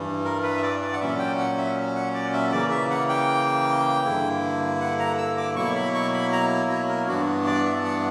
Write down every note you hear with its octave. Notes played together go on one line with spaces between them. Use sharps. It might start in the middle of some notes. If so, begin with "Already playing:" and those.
Already playing: G2 E3 G3
A#4
B4
E5
D5
D5
F#5
A#2 F#3 C#4 E5
G5
F#5
E5
F#5
D5
E5
C#3 E3 A#3 D5
E5
F#5
G5
G2 D3 A#3 E4
F#5
A#5
E6
D6
B2 F#3 A#3 E4 C#6
B5
C#6
B5
A#5
C#5
A#4
G2 E3 B3 D4 F#4
D5
E5
F#5